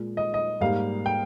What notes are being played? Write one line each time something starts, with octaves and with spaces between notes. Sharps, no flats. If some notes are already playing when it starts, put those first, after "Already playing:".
Already playing: A#2 G#3
D#5
D#5
G#2 G3 A#3 F5
G5